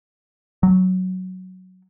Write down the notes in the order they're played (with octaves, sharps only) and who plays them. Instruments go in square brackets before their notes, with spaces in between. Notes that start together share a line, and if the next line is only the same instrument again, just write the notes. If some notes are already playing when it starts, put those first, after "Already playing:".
[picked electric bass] F#3